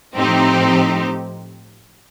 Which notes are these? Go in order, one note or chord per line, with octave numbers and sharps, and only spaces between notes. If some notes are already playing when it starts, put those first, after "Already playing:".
A2 F3 C4 D#4 G4